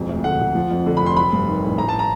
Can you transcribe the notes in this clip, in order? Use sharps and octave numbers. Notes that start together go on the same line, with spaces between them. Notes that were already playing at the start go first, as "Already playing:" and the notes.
Already playing: E1 F2
D2
D3 F#5
E1
F3
F2
D3
B5
F1 C6
F#3 B5
G2
D#3
A1
A1 A#5
A5
A#5